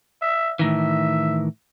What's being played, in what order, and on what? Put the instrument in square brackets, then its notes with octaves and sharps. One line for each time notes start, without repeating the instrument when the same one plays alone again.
[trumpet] E5
[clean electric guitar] A2 D#3 E3 [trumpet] E5